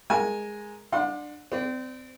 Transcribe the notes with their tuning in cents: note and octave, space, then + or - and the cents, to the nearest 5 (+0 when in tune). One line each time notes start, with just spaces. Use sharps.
G#3 +0 A#4 +0 G#5 +0
D4 +20 F#5 -35 C6 +0
C4 -30 D5 +0